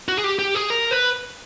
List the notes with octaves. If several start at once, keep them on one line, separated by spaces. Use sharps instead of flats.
F#4
G#4
G4
G4
G#4
A#4
B4